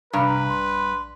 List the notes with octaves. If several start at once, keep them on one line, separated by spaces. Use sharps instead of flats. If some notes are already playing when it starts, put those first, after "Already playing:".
B1 G2 C3 B4 A#5
A#1 C6